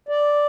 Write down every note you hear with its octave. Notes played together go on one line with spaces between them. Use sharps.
D5